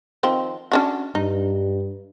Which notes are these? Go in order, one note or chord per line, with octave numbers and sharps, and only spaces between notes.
D#3 F3 C4
C#4 D4 F#4
G2 D#4